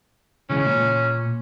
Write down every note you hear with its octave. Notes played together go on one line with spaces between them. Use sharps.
C#3 E3 G#3 C#4
A#2